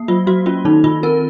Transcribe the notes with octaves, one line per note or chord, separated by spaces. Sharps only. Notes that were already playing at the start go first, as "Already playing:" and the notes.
Already playing: A#3
F#3 F4
F#3 F#4
C#4 F4
D#3 D#4
D#3 F4
C4 A#4